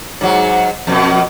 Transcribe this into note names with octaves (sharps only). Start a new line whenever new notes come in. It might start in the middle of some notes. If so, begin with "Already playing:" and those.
G#2 F#3
F2 B2